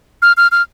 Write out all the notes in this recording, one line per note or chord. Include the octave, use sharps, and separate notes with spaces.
F6
F6
F6